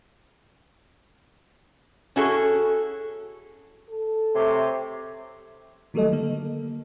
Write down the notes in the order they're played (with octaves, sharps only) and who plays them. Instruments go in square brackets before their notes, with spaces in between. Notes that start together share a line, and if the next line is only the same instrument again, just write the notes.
[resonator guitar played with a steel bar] C#4 E4 F#4 G#4 A4
[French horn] A4
[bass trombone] C3 [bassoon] A3 [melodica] G4 C#5 C6
[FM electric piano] D#3 F#3 G3 A3 A4 D#5
D3 A#3